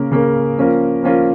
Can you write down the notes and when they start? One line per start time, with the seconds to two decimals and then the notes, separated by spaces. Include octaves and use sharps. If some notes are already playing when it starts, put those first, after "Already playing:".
Already playing: C#3 A#3 C#4 A#4
0.12 C#3 A#3 C#4 A#4
0.57 F3 A#3 C#4 F4 A#4
1.03 F3 A#3 C#4 F4 A#4